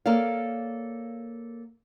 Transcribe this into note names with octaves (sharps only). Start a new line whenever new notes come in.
A#3 A4 C#5 D5 F5